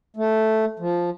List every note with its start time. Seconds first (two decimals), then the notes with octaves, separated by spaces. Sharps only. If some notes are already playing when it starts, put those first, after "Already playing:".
0.16 A3
0.79 F3